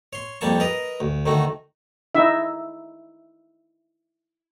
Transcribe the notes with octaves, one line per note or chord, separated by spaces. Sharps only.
C#5 C6
F2 G3 A#3 A5 C#6
A#4 B4 D#5 A#5
D2
D2 D#3 A3 F#4
D#4 E4 E5